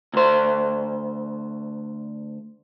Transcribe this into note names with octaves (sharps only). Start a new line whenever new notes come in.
D2 C5